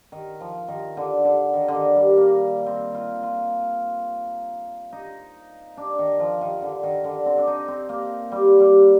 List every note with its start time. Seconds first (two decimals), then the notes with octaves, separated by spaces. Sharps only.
0.12 D#3
0.40 F3
0.68 D#3
0.97 D3
1.25 D3
1.53 D#3
1.68 D3
1.75 D#3
1.96 G3
2.17 A#3
2.66 C4
2.94 F4
3.23 F4
4.93 D#4
5.77 D4
5.99 D#3
6.20 F3
6.41 D#3
6.62 D3
6.83 D#3
7.04 D3
7.26 C4
7.38 D4
7.47 D#4
7.68 C4
7.89 A#3
8.32 G3
8.60 G3